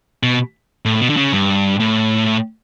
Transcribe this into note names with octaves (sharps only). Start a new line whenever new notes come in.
B2
A2
B2
D3
C#3
G2
A2